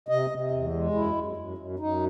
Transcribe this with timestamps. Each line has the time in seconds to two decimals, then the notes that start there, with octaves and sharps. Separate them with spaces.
0.08 C3 D#5
0.30 C3
0.51 E2
0.73 G#3
0.94 F#2 E4
1.15 F#2
1.37 F#2
1.58 F#2
1.79 F#2 D#4